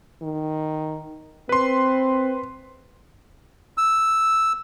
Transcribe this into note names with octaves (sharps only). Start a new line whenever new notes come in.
D#3
C4 B4 C6
E6